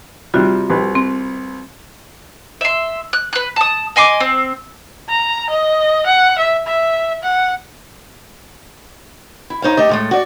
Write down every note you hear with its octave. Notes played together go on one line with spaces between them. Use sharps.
C3 G3 F4 F#4
C2 G4 B4
C4
E5 C6
F#6
B4 F#6
A5 D#6
D#5 G#5 C6 D6
C4
A#5
D#5
F#5
E5
E5
F#5
E4
D#4 C5 C#5 F5
A3 G4 D#5
A2 G#3 A3
F#4 D5